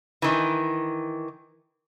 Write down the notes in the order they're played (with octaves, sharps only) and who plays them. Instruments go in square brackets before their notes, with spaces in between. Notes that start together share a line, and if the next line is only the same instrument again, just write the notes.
[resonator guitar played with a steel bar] D#3 E3